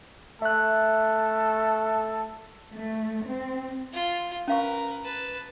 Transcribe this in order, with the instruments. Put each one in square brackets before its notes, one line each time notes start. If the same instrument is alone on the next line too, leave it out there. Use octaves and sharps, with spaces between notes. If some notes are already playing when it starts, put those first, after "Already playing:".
[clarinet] A3 [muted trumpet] A4 [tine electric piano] E5 F#6
[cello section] A3
C4
[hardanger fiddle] F4
[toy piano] C#4 F5 C#6 [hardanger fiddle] A#4 B4
[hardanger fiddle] B4 A5